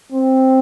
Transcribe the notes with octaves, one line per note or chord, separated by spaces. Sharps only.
C4